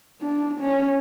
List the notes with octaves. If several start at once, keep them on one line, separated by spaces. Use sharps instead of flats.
D4
C#4